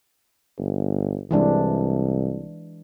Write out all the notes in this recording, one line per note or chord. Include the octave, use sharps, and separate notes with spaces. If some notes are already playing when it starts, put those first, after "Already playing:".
G1
C2 E3 G#3 D4